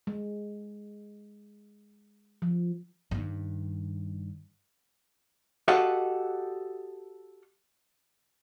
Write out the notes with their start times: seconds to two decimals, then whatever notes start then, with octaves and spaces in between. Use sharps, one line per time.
0.07 G#3
2.42 F3
3.11 G2 D#3
5.68 F#4 G4 A4 D#5 F5 F#5